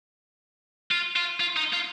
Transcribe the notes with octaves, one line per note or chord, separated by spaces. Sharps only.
F4
F4
F4
D#4
F4